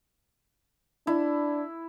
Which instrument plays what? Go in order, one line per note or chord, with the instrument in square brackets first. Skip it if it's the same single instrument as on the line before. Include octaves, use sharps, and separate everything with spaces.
[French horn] D4 [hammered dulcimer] E4